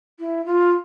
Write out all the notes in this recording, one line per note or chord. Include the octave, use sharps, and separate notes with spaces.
E4
F4